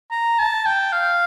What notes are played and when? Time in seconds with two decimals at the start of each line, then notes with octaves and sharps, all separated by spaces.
0.11 A#5
0.39 A5
0.66 G5
0.92 F5